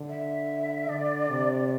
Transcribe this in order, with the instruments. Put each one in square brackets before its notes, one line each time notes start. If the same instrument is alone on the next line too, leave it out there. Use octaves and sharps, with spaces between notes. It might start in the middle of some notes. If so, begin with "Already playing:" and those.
Already playing: [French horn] D3
[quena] E5
[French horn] D3 [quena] D5
[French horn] C3